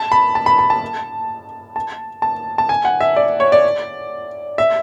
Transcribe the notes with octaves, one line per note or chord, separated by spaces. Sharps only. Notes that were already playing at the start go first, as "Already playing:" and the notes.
Already playing: A5
B5
A5
B5
B5
A5
A5
A5
A5
G#5
F#5
E5
D5
C#5
D5
E5